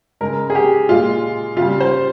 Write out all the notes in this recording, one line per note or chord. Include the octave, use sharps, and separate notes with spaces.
C#3 G#3 A#4
G#4
G4
A#2 G#3 F4
C#3 G3 F4
C5